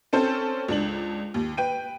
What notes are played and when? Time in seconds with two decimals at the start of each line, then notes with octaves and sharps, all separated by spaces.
0.13 C4 C#4 A4 C5
0.68 C#2 D4 F#7
1.34 D#2
1.57 B4 G5 D#7